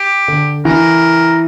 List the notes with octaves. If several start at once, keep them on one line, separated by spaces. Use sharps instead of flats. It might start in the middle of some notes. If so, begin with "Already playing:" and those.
Already playing: G4
D3
E3 A#4